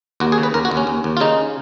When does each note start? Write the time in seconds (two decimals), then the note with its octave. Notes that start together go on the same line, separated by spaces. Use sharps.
0.20 D#2 F#4
0.32 G#4
0.38 C#3
0.43 B4
0.54 D#2 A#4
0.65 F#4
0.71 D#2
0.77 C#4
0.87 D#2
1.04 D#2
1.17 F4
1.20 C#3 D#4